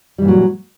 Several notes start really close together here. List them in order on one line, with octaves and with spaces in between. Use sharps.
G3 E3 A#2 F#3